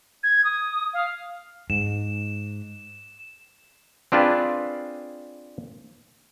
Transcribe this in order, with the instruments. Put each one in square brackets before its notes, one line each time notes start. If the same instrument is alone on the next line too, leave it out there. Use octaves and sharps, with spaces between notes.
[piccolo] G#6
D#6
F5
[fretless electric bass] G#2 [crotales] E7
[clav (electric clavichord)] C4 D4 F4 G#4 B4